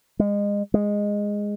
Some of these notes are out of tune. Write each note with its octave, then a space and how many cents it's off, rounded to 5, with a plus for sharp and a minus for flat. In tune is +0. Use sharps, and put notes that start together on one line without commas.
G#3 -30
G#3 -10